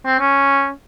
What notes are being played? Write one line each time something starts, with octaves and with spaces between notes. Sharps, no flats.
C4
C#4